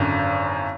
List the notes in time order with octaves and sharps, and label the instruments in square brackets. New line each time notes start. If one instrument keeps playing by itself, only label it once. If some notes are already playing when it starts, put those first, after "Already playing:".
Already playing: [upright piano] G#1 F#2 D3